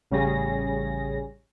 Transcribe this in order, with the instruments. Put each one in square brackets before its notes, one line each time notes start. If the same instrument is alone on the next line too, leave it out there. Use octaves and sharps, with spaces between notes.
[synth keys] A1 C#3 G3 C#4 G#4 A#6